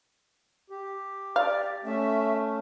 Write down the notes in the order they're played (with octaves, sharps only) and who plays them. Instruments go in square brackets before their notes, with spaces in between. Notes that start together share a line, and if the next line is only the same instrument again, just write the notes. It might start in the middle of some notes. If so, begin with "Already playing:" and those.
[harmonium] G4
[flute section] D5 [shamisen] F5
[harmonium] A3 C#4 [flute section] E5